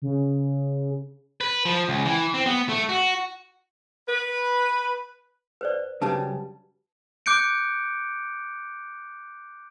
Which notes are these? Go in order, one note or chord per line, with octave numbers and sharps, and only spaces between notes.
C#3
B4
F3
C#2
E3
C4
B3
A3
F#4
B4
B4 C5 D5
F#2 C#3 G3 B4 A5
D6 F#6 G6 C#7 D7